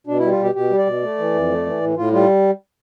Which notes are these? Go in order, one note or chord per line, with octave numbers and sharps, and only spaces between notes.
B2 D4
G3 E4
F4
B2 G4
B2 G4
G3
D5
B2
A3
E3
F2
A3
E3
A2
A2 F4
G3 F4